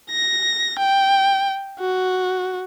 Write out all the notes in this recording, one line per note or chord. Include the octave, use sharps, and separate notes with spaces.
A#6
G5
F#4